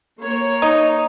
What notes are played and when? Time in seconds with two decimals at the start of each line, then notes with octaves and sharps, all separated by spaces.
0.19 A#3 C#5
0.62 D#4